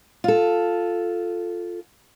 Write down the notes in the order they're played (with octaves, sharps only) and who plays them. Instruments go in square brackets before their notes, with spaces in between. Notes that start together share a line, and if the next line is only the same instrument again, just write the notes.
[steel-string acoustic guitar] F4 A4